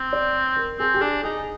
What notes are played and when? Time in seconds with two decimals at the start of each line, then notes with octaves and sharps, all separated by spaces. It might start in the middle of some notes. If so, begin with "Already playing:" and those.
Already playing: C4
0.13 D5
0.56 A#4
0.79 C4 G#4
0.94 G4
1.01 D4 G#4
1.24 D#4 G#4